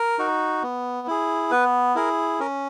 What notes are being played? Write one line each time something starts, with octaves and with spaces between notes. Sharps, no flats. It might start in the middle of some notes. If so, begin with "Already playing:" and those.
Already playing: A#4
D#4 F#4
B3
E4 G#4
B3 B4
E4 G#4 A#4
C#4 A#4